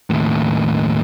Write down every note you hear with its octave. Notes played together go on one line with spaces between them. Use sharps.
D#2 A2